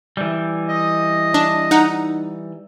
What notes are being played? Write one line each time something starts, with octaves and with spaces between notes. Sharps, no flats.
E3 G3
D#5
D4
D#4 F#5